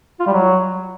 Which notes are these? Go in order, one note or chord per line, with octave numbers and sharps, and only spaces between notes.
F4
G3
F#3